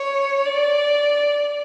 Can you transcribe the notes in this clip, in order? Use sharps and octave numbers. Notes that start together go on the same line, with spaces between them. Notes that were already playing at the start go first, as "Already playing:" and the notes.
Already playing: C#5
D5